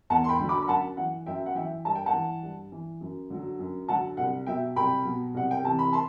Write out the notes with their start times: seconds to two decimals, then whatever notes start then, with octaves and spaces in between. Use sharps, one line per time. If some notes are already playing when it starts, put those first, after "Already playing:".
0.10 E2 F#5 A5
0.24 C6
0.29 G5 B5
0.39 D3 F#3
0.49 B5 D6
0.62 B5
0.68 F#2 F#5 A5
0.97 E3 F#5
1.26 F#2 E5 G5
1.46 F#5
1.55 E3 E5 G5
1.85 G2 A5
1.95 G5
2.06 F#5 A5
2.13 E3
2.43 G2
2.72 E3
3.01 F#2
3.30 D3 F#3
3.59 F#2
3.88 D3 F#3 F#5 A5
4.17 C2 F#5
4.46 B2 F#3 E5 G5
4.76 C2 G5 B5
5.05 B2 F#3
5.34 C2 F#5
5.51 G5
5.64 C3 E3 A5
5.79 B5
5.92 A5 C6